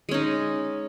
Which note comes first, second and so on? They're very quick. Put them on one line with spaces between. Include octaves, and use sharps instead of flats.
G#3 C#4 D#4